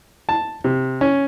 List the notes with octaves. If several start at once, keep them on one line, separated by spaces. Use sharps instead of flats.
A5
C3
C#4